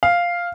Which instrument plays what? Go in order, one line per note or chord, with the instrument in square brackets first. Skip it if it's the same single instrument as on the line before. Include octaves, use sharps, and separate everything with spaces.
[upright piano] F5